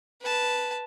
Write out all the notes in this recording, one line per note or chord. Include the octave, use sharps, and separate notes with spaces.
B4 A5